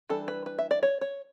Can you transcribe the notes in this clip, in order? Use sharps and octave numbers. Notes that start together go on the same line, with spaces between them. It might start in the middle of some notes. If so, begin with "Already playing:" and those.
E3 G3 D4 A4
B4
B4
E5
D5
C#5
C#5